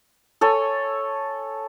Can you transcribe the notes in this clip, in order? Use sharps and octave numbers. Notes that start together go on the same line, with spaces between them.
A4 C#5 G#5